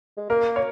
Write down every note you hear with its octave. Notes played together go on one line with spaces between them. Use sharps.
G#3
A#3 A#4
C#5